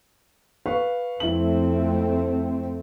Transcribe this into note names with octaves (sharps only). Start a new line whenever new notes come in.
B4 F5 C#6
F2 A3 C4 E4 F#7